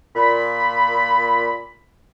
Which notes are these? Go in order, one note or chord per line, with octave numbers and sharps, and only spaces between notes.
A#2 B5